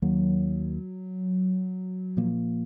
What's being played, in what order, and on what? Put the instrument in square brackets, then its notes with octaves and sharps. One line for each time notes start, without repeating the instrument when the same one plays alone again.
[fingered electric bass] D#2 D#3 A#3 [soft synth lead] F#3
[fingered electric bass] A#2 F3 A#3